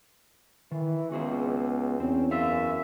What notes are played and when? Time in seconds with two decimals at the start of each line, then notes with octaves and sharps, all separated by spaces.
0.72 D#3 E3
1.12 C#2 B3 F#4 G#4 C5
2.00 E2 C4 C#4
2.31 F#2 F#4 E5 F5